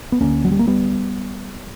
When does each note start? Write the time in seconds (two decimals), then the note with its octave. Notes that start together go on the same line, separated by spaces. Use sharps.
0.12 B3
0.20 D2 D3 A#3 C#4
0.45 F#3
0.52 G3
0.59 A#3
0.67 G3 B3